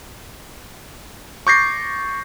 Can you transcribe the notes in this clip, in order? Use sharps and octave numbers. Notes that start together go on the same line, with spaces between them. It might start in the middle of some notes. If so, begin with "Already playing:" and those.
C#6 D6 G6 A6 A#6 C7